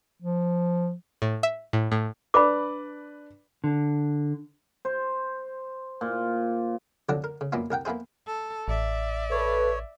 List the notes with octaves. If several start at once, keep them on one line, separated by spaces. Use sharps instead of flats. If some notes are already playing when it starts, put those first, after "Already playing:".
F3
A2
E5
A2
A2
D4 B4 D5 B5 D6
D3
C5
A#2
C2 D3 F3 F#3 D4 F#5
A#4
C#3
F#2 A#2 A#3 B3 E4 F4
C2 A#4 F#5 G5
A#3 B3 E4 G#4 C5
A4
A1 D5 E5
A4 B4 C#5